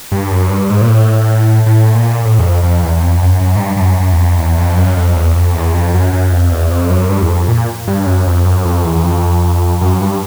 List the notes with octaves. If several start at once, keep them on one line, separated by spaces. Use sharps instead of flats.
G2
F#2
G2
G#2
A#2
A2
A2
A#2
A2
E2
F2
F2
E2
E2
F2
F#2
F#2
G#2
G2
G2
F#2
F#2
E2
F2
E2
F2
F#2
F2
E2
F2
E2
F2
F#2
F#2
F2
E2
F2
F#2
G2
E2
F2
A#2
G2
F#2
F2
F#2
F2
E2
E2
F2
F#2
G2